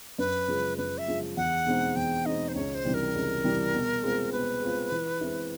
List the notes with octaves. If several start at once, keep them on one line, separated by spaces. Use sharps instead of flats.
F#2 B4
C#3 F3 G#3
F#2 B4
E5
C#3 F3 G#3
E2 F#5
B2 G#3 C4 D#4
E2 G5
B2 G#3 C4 D#4 D#5
C5
C#2 C#5
C5
C3 E3 G3
A#4
C#2
C3 E3 G3
B2
G#3 C4 F4
B2 B4
G#3 C4 F4
E3
G#3 C4 E4